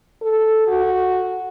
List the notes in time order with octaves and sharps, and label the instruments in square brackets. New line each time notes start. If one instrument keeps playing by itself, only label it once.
[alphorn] A4
F#4